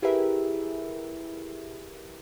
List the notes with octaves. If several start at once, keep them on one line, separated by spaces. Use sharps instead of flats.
E4 G4 G#4 A#4 B4 E5